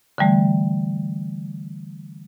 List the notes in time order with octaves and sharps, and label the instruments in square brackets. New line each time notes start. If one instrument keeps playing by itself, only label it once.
[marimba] D3 E3 G3 A3